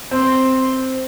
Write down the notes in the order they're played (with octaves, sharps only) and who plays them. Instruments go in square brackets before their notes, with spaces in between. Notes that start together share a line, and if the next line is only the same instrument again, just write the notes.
[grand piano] C4 [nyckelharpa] C5